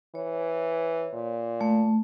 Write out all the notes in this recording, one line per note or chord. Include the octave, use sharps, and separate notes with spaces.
E3 C#5
A#2
A3